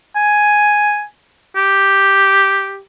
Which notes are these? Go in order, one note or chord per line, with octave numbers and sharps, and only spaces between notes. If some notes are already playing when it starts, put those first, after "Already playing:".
G#5
G4